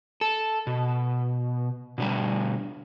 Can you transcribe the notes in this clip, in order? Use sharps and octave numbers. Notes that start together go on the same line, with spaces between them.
A4
B2
B2 D3 G3